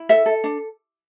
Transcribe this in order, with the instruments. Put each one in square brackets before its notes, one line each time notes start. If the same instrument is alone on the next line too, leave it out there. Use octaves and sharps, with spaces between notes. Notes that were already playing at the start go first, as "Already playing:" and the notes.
Already playing: [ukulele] E4
A4 E5
A4
D4